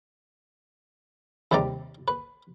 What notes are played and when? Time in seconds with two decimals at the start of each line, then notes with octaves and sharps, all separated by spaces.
1.51 D#2 C3 G3 D5 A#5
2.08 B4